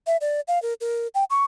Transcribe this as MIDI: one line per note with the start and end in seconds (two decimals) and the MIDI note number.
0.07 0.17 76
0.21 0.41 74
0.48 0.61 77
0.62 0.73 70
0.81 1.08 70
1.15 1.24 79
1.30 1.44 85